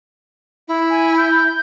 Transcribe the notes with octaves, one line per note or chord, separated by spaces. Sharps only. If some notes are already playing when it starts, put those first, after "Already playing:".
E4
G#5
G6